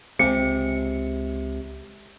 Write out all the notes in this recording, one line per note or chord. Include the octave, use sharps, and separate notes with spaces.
C#2 C3 G#3 C#7